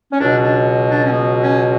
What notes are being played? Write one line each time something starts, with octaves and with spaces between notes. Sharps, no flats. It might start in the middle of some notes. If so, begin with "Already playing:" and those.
C#4
C#2 B2 F#3 D4
D4
D4
C#4
B3
C#4